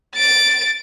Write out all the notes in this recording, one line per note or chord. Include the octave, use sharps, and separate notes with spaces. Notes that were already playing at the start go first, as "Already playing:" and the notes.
A6 D7